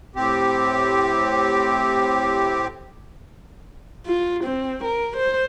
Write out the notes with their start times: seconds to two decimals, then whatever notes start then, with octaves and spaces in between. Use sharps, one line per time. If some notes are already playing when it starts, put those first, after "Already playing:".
0.16 A2 C4 G4
4.06 F4
4.44 C4
4.84 A#4
5.16 C5